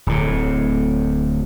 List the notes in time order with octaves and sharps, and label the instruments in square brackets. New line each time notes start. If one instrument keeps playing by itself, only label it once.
[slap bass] D1 A2